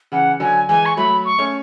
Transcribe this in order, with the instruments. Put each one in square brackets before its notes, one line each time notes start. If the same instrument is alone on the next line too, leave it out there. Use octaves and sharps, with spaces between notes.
[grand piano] C#3 E3 [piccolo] F#5
[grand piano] D3 F#3 [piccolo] G#5
[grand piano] E3 G#3 [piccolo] G#5
[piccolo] C#6
[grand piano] F#3 A3 [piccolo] B5
[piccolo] C#6
[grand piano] A3 C#4